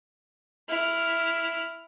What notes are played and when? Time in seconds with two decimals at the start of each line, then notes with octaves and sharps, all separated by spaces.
0.69 E4 F6